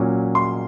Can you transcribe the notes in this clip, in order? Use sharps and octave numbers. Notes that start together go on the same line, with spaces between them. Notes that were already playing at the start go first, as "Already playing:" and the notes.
Already playing: A#2 F#3 C#4
C6